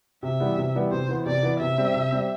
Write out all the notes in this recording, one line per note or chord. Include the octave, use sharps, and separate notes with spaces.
C3 E5
E3 G3 B3
C3
E3 G3 B3
C3 C5
E3 B3
C3 D5
E3 B3
C3 E5
G3 C4
C3
G3 C4